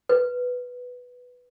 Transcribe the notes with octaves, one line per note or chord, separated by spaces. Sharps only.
B4